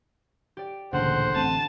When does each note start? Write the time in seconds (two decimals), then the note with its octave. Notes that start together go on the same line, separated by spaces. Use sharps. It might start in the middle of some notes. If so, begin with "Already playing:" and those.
0.57 G4 D5
0.93 A1 D2 A#2 C#3 C5 F#5
1.35 A1 D3 C4 A5 D#7